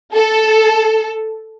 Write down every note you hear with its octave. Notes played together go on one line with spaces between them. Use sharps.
A4